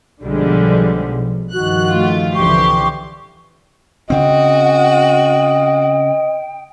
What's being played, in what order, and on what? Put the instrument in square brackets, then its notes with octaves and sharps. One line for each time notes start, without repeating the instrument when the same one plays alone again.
[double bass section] B1 B2 F3 [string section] D3 G3 G#3
[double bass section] G2 D#3 F3 [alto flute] F#4 [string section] F#6
[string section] A3 F4
[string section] C2 G4 C6 [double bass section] D3 E3 F3 [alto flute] C#6
[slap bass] C#3 C4 [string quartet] F#4 [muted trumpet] D#5 [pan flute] G5